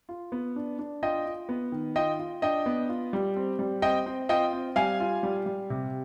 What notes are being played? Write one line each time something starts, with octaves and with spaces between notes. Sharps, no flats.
F4
B3
D4
D4
F4 D#5 G5
F4
B3
D#3
F4 D#5 G5
F4
D4 D#5 G5
B3
F4
G3
C4
G3
C4 D#5 G5
C4
F4 D#5 G5
C4
G3 F5 G#5
F4
G3
G3
C3